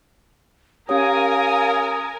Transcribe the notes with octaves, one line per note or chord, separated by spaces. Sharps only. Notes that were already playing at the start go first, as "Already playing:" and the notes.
C#4 G4 A#4 C#5 F5 G#5 A#5 D#6